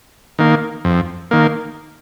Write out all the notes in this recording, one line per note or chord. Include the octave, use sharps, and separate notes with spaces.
D#3 A#3
F2
D#3 A#3